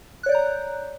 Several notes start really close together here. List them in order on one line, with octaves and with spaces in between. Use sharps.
F#6 C#5 D5 G6 A#5